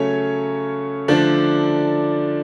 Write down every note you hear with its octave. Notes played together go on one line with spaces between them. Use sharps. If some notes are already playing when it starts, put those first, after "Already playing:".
Already playing: C#3 F#3 A3 C#4 C#5
D3 F3 A3 D4 D5